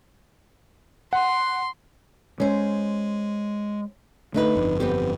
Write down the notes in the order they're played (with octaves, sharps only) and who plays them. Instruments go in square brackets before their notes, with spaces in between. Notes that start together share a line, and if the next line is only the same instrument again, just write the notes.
[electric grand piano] F#5 [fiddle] C6
[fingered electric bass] G#3 [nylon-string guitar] C#4 C5
[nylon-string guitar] D3 D#4 B4 [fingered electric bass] A3
[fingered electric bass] G1 F2
[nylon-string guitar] B3 C4 G4